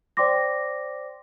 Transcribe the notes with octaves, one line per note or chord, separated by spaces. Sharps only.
C5 D5 G5 C6 D6 A#6